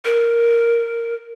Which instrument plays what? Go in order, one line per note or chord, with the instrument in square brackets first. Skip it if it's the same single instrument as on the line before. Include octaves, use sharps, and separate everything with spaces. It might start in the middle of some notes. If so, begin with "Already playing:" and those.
[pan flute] A#4